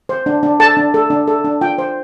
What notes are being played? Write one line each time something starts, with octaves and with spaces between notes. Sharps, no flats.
C5
D4
D4
A4 A5
D4
A4
D4
A4
D4
F4 G5
C5